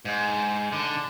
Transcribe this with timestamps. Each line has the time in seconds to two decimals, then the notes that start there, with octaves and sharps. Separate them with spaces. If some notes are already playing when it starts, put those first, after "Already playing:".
0.05 G#2
0.72 D3